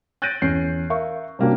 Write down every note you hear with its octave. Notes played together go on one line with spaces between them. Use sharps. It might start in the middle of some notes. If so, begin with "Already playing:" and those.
F#6 G6 A6 A#6 D7 D#7
E2 C#4 C7
A#4 E5 F5 C#6
C3 G3 A#3 C#4 D4 F#4